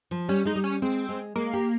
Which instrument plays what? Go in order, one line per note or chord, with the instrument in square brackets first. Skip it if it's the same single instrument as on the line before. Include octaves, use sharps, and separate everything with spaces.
[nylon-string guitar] F3
[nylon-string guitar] G3 [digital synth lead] C#4
[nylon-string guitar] G#3 [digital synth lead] D#4
[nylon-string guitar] G3
[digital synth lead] C#4
[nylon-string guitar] G#3 [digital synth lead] C4
[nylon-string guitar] G#3
[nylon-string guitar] G#3 [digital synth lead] A#3
[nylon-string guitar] G4